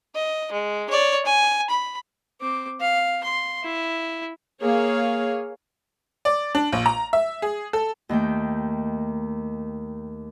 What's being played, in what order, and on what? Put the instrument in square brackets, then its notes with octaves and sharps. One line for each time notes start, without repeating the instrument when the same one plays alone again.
[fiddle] D#5
G#3
C#5 D5
G#5
B5
[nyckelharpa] C4 D6
F5
C6
E4
[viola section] A#3 G#4 C#5 F5
[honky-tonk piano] D5
D4
A#1
A#5
E5
G#4
A4
[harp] D#2 D#3 A3 G5